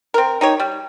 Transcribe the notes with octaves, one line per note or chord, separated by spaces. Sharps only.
C4 A#4
D#4 G4 C#5
G3